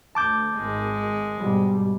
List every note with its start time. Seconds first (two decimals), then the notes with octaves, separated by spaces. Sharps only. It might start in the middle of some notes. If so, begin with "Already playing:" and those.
0.15 D2 A5 D6 G6
0.56 G#1 G#3
1.37 G#2 B2 G3